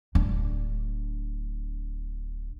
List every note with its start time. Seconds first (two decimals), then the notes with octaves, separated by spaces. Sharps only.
0.15 D1 D4